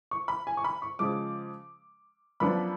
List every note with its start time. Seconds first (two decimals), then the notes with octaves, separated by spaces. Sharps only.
0.11 C#6
0.28 B5
0.47 G#5
0.57 C#6
0.64 B5
0.82 C#6
0.99 C#3 F3 G#3 D6
2.40 F#2 F3 B3 D4 B5